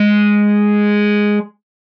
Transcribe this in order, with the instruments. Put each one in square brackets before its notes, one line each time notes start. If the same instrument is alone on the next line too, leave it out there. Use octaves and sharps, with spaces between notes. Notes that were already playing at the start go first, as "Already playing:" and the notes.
Already playing: [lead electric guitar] G#3